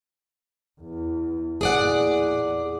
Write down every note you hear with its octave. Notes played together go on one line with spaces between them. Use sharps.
E2
E2 A#2 G#4 D5 F#5